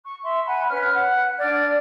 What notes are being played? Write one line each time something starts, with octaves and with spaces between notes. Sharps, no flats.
C#6
E5 C6
F#5 G#5 B5
C#4 B4 F6
F#5
D4 D5 F6 G#6